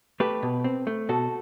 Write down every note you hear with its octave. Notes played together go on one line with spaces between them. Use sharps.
A3 G4 B4
B2
C4
A3
B2 F#4 A4